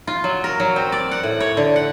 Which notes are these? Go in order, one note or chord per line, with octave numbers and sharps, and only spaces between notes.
F4
F#3
A#4
F#3
C4
D5
F#5
A2
C#5
D3
F#5